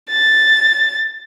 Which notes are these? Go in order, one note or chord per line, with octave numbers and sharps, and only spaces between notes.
A6